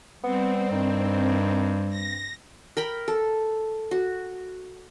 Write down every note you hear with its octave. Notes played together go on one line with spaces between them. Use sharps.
G3 B3 C4
G2 D#3
A#6
A#4 G5 B5
A4
F#4